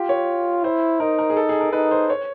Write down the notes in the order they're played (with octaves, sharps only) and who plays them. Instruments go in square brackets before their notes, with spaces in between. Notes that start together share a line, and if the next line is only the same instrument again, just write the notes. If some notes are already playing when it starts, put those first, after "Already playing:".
Already playing: [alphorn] F4 [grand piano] G4
[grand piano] C#5
[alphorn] E4 [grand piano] C5
[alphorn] D#4 [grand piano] A#4
[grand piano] A#4
G#4
A4
G#4
A#4
[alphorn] D#4 [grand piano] B4
[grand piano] C5
C#5